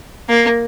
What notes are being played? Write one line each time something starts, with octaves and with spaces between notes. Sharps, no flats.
A#3